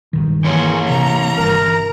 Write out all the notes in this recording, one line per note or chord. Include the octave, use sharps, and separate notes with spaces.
G1 C2 D#3
E3 A#3 E4 G#4 C#5
C3 A#5
G1 A#4